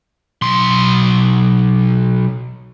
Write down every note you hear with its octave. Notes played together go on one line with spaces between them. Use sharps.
B1 C6